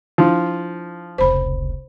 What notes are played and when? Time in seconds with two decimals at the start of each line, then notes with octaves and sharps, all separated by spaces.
0.18 F3 D4 E4 F4
1.18 F1 C#2 C5 B5